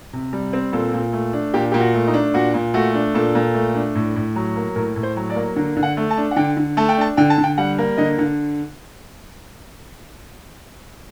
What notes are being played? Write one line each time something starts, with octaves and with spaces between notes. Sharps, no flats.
C3
G3
C4
A#2 A4
A#2
A3
D4
A#2 G4
A#2 G4
F#4
A3
D#4
D4
A#2 F#4
A#2
A3 F#4
D4
A#2 A4
A#2
A3
D4
A2
A2
F#3
A#3
A2 A#4
A2
C5
F#3
D5
A#3
D3
D3
F#5
A3
A5
D4
F#5
D3 G5
D3
A3 A5
G5
D4 A5
D3 G5
A5
D3
G5
G3 F#5
A#3
D3 D#5
D3